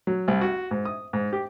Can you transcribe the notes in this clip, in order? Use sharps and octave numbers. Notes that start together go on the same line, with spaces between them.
F#3
C2
F#4
G#2
D#6
G#2
G4